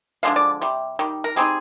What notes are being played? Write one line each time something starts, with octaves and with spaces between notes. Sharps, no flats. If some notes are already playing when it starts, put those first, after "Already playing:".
D3 F3 G#3 D4 F5
D5
C3 G3
D#3 G3
A#4
G3 C4 D#4 G#4